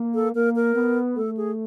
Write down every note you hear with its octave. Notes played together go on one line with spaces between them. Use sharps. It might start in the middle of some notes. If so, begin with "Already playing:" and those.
Already playing: A#3
A4
A#3 A#4
A#4
B3
A3 A4
G#4